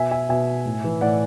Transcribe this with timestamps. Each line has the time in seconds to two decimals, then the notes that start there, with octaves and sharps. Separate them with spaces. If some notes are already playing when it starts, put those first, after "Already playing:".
Already playing: B2 E5 G#5
0.11 E5 G#5
0.29 B2 E5 G#5
0.66 A2
0.84 E3
1.01 A2 D5 F#5